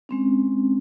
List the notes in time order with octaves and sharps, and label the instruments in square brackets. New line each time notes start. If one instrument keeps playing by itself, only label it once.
[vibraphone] G#3 C4 C#4